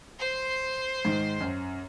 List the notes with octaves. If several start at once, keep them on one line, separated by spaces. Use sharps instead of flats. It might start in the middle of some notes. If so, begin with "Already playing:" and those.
C5 C6
G#2 D#3
F#2